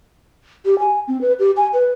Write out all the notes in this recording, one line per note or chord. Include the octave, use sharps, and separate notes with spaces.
G4
G#5
C4
B4
G4
G#5
B4